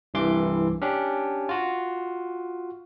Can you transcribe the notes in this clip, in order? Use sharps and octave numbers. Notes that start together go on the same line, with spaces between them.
C2 G2 E3 C6 D6
C#4 D4 G4
F4 F#4